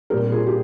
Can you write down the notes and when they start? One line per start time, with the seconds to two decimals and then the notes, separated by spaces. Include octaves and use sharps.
0.10 A#2 G3 C4 G4 A#4
0.32 F4 G#4
0.47 G4